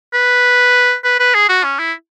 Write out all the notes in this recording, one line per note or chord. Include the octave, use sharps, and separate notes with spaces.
B4
B4
B4
G#4
F#4
C#4
E4